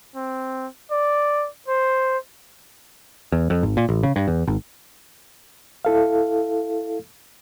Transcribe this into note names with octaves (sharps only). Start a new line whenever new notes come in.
C4
D5
C5
E2
F2
G#1
A#2
A1
C#3
G2
E2
G#1
E4 A4 F5